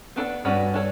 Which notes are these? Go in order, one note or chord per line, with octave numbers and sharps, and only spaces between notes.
B3 D4 A4 D5
G2 C#4 F#4 B4 D5
D4 A4 C#5